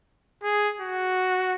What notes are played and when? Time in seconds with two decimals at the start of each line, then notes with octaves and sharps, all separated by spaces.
0.43 G#4
0.81 F#4